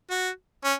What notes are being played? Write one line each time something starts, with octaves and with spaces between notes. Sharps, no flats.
F#4
C#4